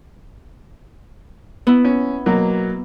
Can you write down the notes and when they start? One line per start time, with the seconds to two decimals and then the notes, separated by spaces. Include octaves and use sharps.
1.67 B3 E4
1.84 C#4
2.26 B2 F#3 A#3